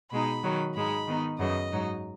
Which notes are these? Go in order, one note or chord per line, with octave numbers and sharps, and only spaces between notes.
B2 G#3 D#4 B5
D#3 F#3 D#4
G#2 G#3 D#4 B5
D#3 B3 D#4
F#2 C#3 B3 D#5
G#2 F#3 D#4